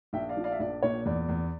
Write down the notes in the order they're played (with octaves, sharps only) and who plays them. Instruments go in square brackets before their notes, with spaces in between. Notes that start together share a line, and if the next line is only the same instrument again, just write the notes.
[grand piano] A#1 E5 G5
D5 F5
F3
D5 F5
E5
A#1 D5
A#2 C#5
E2 D5
E2